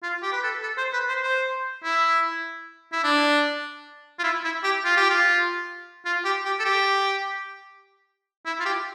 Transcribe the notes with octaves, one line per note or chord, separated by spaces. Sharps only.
F4
G4
B4
A4
A4
C5
B4
C5
C5
E4
E4
D4
F4
E4
E4
G4
F4
G4
F4
F4
G4
G4
A4
G4
E4
F4
G4